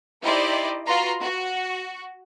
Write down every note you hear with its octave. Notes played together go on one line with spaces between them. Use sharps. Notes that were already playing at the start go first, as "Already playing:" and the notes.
D#4 E4 G4 C5 D5 D#5
F4 F#4 B4 A#5 C6
F#4